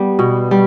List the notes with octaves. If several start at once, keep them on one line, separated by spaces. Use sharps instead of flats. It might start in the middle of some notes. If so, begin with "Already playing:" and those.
Already playing: G3 B3
B2
G3